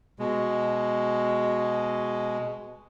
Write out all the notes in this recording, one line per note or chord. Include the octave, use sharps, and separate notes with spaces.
B2 G#3